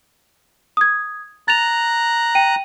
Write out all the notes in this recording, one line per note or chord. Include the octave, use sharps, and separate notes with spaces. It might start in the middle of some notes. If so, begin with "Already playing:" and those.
D#6 G#6
A#5 F#6 A6 F7
G5 D#7